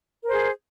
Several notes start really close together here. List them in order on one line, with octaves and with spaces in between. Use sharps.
A#4 C5 G#4